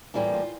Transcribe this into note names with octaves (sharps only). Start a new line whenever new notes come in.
A2 E3 G3 A#3 F4
F4